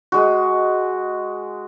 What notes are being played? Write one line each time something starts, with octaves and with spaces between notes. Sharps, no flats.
G#3 F#4